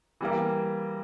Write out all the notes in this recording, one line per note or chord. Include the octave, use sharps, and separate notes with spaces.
E3 G3 A#3